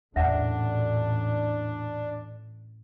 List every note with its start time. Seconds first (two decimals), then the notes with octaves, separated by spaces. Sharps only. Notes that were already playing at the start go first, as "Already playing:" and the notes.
0.16 A1 E2 A#2 D4 E5 F#5